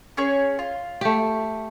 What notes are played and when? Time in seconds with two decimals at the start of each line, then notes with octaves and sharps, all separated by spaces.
0.17 C#4 G#4 C#5
0.59 F4
1.01 A3 G4